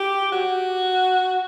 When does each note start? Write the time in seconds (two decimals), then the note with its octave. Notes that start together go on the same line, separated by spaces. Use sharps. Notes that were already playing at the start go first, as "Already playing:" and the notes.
Already playing: G4
0.32 F#4